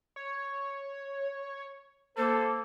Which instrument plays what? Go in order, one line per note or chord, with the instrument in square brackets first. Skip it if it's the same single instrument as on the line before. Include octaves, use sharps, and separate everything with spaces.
[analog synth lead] C#5
[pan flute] A#3 [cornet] A4 [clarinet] C5